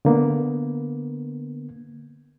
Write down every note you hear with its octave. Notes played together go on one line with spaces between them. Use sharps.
D3 A#3 B3